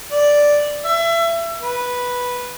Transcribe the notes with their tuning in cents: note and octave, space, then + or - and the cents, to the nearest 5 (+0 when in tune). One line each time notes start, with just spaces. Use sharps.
D5 +0
E5 +30
B4 -5